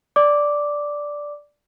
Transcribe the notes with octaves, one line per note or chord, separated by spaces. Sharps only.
D5 D6